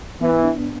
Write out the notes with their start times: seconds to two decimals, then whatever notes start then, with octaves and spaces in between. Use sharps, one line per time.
0.21 E3 B3
0.44 D4